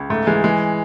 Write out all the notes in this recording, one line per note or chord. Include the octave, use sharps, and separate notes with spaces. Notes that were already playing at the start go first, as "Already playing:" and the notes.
Already playing: C#2
G#2 A3
E3 G#3
E3 G#3